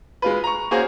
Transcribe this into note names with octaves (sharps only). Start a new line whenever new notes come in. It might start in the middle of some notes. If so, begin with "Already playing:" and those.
G#3 F4 B4
A#5 C#6
A#3 C#4 F#4 G#4 C5 F5